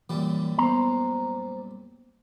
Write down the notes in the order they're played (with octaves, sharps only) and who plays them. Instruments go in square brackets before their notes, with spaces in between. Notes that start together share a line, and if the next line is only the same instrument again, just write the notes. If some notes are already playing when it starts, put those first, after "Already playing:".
[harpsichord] F#2 A#2 G3 [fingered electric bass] E3
[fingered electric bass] B3 [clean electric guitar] C5 A#5